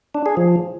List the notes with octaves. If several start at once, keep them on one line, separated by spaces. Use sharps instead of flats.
D4
G#4
F3